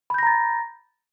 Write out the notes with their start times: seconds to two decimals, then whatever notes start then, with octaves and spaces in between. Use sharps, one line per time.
0.10 B5
0.14 G6
0.18 A#6
0.23 A#5
0.27 A6